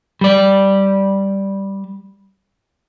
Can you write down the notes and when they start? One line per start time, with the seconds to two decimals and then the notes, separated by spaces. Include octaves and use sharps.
0.21 G3 D5